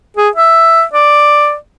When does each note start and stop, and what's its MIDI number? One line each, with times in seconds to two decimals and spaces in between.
0.17 0.29 68
0.36 0.83 76
0.93 1.55 74